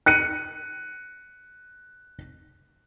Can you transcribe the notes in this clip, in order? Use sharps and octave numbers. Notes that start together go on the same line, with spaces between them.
F#6 C#7 D#7